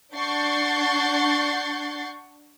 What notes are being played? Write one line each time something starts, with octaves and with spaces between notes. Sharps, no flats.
D4 F#5 C#6 G6 A6 C7